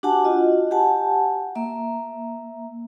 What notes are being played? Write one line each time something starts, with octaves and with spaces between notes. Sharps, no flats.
D4 F#4 G4 F#5 G#5 A5
F4 F#4 D#5
G4 F#5 G#5 A5
A#3 E5 A#5